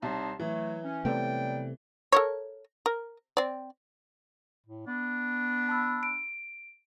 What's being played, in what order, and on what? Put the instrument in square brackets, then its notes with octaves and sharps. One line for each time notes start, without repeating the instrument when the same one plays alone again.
[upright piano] C2 [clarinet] D#4 [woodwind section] C#5 A5 C6
[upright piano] E3 [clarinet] F#3 [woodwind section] A3
[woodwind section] C#4
[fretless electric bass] C3 A3 B3 [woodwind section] F#3 G3 D5 [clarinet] G5
[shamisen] A4 A#4 C#5
A#4
C4 D5
[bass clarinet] A2
[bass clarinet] B3 [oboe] D4
[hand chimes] A5 B5 E6
D7